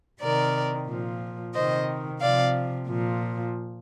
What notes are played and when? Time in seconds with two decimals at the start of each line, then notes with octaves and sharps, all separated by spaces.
0.21 C3 D#3 A#4 D5
0.88 A#2 F3
1.54 C3 D#3 C5 D#5
2.21 C3 F3 D5 F5
2.88 A#2 F3